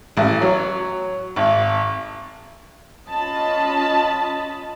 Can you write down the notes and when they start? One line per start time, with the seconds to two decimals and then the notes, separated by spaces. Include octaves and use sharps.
0.17 A1
0.41 F#3
1.36 G#1
3.09 C#4 F4 D#5 A5 B5